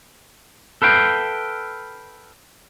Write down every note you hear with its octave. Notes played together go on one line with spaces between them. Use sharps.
A4 B4 F5 G5